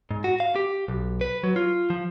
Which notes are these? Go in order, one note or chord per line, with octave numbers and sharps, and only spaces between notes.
G#2
F#4
F5
G4
B1
B4
F#3
F4
F3